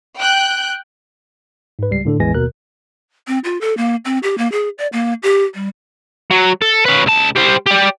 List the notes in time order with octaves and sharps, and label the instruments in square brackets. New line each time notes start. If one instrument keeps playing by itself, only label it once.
[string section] G5 F#6 G6
[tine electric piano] G#2 B4
C#2 G3 C7
A2 D3 D4 A4
A1 E2 E3 G#3 G#5 A#6
D#2 B2 A#4 F#6
[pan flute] C4
F4
A4
A#3
C4
G4
A#3
G#4
D5
A#3
G4
G3
[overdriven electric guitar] F#3
A4
C#4 B4
C#2 A5
G3 C5
G4 D5